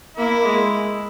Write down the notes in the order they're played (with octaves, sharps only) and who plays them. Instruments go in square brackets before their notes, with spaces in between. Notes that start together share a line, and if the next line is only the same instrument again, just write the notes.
[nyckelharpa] A#3 [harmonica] E4
[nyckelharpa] G#3